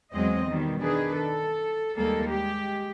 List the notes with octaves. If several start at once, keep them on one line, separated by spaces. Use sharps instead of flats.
E2 F3 F#3 G#3 C4 D#5
B2 D#3 G3
D#3 D4 G#4 B4
A4
D#2 G3 G#3 A#3 A4 A#4
G#3 G4